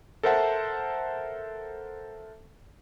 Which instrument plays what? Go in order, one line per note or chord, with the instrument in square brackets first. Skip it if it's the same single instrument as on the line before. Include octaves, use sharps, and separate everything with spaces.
[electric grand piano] A4 A#4 C5 E5 F#5 A5